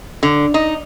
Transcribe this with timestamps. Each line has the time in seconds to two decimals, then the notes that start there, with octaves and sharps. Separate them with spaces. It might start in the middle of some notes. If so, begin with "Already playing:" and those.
0.23 D3
0.54 D#4